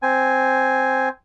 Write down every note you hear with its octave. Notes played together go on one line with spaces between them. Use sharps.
C4 G#5